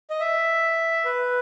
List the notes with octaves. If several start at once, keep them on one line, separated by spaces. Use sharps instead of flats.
D#5
E5
B4